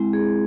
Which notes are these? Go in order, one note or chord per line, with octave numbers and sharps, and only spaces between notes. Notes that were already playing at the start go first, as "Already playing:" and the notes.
Already playing: G#3 C4 E4
G#4